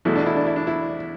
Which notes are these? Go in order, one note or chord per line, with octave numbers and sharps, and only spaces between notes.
E2 B2 A3 E4
D4
E4
D4
E4
D4
E4